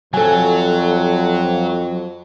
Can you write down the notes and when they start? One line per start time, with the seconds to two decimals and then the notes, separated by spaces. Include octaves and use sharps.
0.14 F2 F#3 A4 G#5